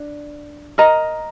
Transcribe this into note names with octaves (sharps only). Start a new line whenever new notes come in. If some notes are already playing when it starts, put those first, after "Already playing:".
Already playing: D4
A#4 D#5 A#5